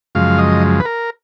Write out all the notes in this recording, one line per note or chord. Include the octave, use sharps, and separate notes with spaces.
F#2 C#3 F3 G#3 F5
D#5
B4
A#4